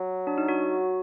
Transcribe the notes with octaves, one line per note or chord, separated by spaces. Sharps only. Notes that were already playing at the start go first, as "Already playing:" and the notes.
Already playing: F#3
D4
D#4
F#4